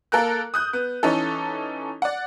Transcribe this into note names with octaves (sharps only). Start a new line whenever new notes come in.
A#3 A4 A#4 F#6
D#6 F#6 G6
B3
E3 C#4 D#4 A4
D5 F#5